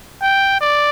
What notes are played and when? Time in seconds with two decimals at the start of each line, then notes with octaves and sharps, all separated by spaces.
0.22 G5
0.60 D5